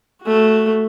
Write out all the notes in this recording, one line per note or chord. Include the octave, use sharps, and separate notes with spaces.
A3 F#4